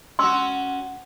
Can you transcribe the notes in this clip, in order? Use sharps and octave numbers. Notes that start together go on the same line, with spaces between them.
C#4 F#4 C6 E6